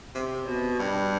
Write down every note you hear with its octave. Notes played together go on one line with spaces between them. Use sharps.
C3
B2
G2